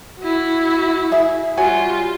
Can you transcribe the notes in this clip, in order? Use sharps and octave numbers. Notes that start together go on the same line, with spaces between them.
E4 F#4
G#4 E5
G3 F4 F#4 C#5 G#5